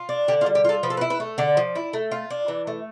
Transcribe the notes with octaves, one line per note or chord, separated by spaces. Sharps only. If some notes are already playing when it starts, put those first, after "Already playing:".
Already playing: F4
D4
D3 G4
F4
G3
G4
F4 A4
F3 B4
A4
B4
E4
B4
A3
D3 D5
F3
E4
A3
F4
D4
E3
A3